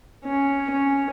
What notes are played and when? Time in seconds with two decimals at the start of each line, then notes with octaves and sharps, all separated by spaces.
0.25 C#4
0.71 C#4